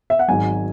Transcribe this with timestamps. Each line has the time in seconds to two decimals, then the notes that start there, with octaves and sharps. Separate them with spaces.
0.10 E5
0.19 F#5
0.28 G#1 G#2 F#3 G#5